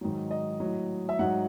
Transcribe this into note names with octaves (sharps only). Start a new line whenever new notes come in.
G#2 D#3 F#3
D#5
A2 F#3
E5
G#2 F#3 F#5